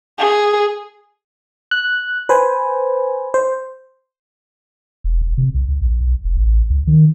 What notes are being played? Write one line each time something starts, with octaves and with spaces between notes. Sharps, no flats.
G#4
F#6
B4 C5 G#5
C5
E1
E1
C3
C2
C#2
A#1
B1
F1
A1
C#2
D#3